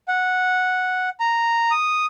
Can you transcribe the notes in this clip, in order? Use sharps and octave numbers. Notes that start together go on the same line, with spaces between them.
F#5
A#5
D#6